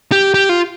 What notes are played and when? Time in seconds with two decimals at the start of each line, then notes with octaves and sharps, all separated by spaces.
0.12 G4
0.34 G4
0.49 F4